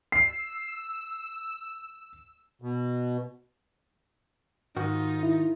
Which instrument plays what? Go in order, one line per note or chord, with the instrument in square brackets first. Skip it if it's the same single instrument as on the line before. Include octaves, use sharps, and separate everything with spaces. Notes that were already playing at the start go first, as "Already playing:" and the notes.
[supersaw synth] E6 [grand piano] C7
[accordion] B2
[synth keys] G#2 [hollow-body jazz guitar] D#3 F#4 [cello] D#4 F4
[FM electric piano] E4